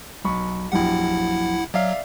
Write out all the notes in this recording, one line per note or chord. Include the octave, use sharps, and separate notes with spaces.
B1 B5 C#6
A#1 F#2 E4 G4 F#5
F#3 D5 E5 F5